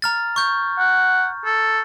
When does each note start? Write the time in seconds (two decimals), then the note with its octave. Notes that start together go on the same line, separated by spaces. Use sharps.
0.02 A#5 F6 A6
0.36 C#6 G6
0.79 F#5
1.46 A4